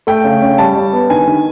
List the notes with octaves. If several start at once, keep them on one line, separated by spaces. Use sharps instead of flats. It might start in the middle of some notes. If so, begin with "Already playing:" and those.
A3 G5
C#3
C#4
G3 A5
G3
B3
D#3 G#5
D#3